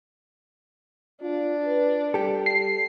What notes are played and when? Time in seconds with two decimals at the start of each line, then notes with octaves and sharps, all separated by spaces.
1.22 D4 F4
1.66 B4
2.14 G3 G4 A4
2.46 C7